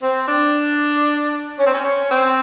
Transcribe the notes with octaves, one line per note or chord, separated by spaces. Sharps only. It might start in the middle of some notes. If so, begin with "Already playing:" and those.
C4
D4
C#4
C4
C#4
C#4
C4